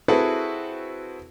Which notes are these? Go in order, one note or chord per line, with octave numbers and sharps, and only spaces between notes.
C4 E4 F#4 G#4 A4 B4